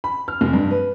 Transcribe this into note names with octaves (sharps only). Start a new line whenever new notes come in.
B5
F6
F1
G2
B4